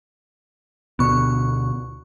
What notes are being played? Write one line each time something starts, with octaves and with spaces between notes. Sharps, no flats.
D2 B2 D3 B3 C#6